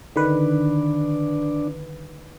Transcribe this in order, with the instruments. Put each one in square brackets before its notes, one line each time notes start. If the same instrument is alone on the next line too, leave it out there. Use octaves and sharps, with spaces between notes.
[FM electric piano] D3 D#3 B4 [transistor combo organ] D4